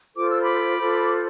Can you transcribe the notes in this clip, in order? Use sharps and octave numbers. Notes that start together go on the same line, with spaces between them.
F4 A4 C5 D6
E6
B5 D6
F4 A4 C5